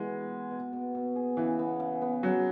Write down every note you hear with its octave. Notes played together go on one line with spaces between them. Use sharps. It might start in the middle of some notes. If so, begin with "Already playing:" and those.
Already playing: B2 E3 G#3
B3
G#4
B2
B2
B2
G#4
C#3 E3
B3
C#3
B3
C#3 F#3